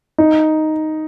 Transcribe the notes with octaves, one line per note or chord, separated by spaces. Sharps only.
D#4